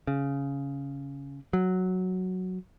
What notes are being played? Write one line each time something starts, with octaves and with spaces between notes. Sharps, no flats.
C#3
F#3